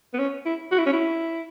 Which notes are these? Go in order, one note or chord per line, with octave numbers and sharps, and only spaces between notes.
B3
C#4
E4
F#4
E4
C#4
E4